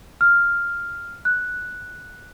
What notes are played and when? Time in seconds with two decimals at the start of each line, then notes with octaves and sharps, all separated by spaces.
0.21 F6
1.25 F#6